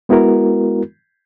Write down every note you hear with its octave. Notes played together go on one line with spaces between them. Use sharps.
G#3 B3 E4 F#4 A#4